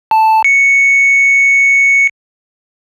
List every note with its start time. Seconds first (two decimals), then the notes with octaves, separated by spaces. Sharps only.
0.11 A5
0.44 C#7